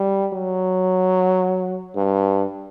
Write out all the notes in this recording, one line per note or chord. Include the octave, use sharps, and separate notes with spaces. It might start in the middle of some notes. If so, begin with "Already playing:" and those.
Already playing: G3
F#3
G2